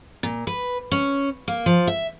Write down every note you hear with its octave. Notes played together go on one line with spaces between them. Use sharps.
A#2
B4
C#4
A#3
F3
E5